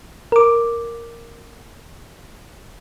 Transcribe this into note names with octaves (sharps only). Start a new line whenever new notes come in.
A#4 D6